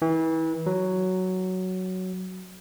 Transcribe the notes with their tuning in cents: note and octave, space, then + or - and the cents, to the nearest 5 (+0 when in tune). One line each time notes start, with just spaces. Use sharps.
E3 -30
F#3 +5